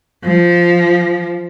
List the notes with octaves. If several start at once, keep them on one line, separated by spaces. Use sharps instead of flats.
F3